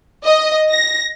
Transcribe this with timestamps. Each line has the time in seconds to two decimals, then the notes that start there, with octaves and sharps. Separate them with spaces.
0.24 D#5
0.70 A#6